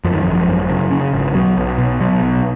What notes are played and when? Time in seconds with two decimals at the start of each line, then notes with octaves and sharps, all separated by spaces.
0.04 F#2 F3
0.14 D#3
0.22 G#1 F3
0.48 F#2
0.70 C#3
0.91 C#3
1.13 G#1
1.34 B1 F#3
1.57 B1
1.78 B2
2.00 B2 F#3
2.22 B1